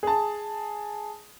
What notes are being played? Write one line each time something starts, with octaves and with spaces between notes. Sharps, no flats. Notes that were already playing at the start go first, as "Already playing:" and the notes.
G#4 A5